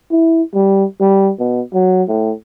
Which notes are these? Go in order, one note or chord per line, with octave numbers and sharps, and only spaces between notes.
E4
G3
G3
B2
F#3
A2